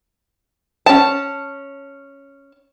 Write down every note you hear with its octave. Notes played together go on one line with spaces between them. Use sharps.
C#4 A5